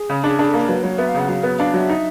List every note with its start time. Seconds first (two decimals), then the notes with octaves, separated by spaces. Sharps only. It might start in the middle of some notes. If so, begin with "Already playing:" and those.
Already playing: G#4
0.10 C#3
0.24 D4
0.39 D4 G#4
0.49 A#3 A4
0.59 A#4
0.68 F#3 B4
0.83 F#3 C#5
0.98 B3 E5
1.08 F5
1.15 C#3
1.20 F#5
1.28 F#3 F5
1.43 B3
1.58 D4 F5
1.74 F#3 F5
1.78 E5
1.89 D#4